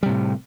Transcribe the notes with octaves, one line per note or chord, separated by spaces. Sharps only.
A2 C3 G3